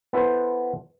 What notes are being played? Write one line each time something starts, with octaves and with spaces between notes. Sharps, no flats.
B3 E4 A4 B4 C5